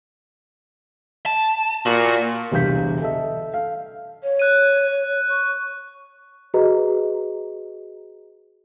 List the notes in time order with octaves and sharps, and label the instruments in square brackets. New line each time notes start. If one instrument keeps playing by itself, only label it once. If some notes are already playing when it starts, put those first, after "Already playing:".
[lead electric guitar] A5
[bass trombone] A#2 [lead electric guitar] F#4
[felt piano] E1 C2 D3 F5 G6 B6
A4 D#5 E5
F5
[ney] C#5
[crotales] F#6 D#7
[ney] C#6
[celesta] F#4 G#4 B4 D#5 A#5